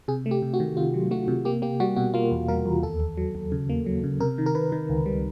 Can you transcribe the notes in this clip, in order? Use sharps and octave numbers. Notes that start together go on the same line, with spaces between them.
C3 G#4
A3
G4
C3
F#4
D#3
C3 F4
F#3
A3 F#4
C3
A#3 G4
A#3 G4
G3 F#4
B2 F#4
A#3 F4
E2
G3 A#4
E2
D#2 A4
D#2
F#3
D#2
C#3
A#3
F#3
C#3
C3 A#4
D#3
A#4
D#3 B4
D#3
C#2
G3